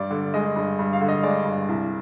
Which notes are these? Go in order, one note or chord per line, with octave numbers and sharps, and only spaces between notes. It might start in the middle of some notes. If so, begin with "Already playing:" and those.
Already playing: G2 D5
D3
G#3 D#5
G2
G2
F5
D3
D#5
G#3 D5
G2
C2